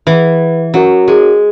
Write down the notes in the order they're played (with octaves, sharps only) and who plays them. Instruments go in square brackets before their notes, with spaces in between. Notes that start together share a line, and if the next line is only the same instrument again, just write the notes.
[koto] E3 [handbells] G#4 B4 F#5
[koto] F#3 [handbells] C#4 F#4 A#4 C#5
[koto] G#3